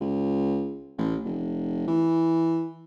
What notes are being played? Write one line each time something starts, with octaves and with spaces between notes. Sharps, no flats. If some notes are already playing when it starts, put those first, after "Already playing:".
C#2
A1
F1
E3